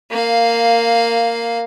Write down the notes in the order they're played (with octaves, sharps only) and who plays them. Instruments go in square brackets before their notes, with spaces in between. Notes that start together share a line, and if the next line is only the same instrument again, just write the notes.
[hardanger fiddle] A#3 F5